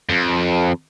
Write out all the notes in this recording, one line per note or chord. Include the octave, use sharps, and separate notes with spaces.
F2